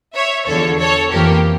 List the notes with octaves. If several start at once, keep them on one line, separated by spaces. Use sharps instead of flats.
C#5 E5
E2 D3 F3 A4 C#5
A4 C#5
F2 E3 A#3 G4 A#4